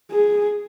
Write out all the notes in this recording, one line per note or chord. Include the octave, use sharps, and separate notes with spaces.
G#4